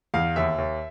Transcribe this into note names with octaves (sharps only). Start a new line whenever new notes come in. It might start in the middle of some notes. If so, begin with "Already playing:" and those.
E2 F5
D#2 E5
D#2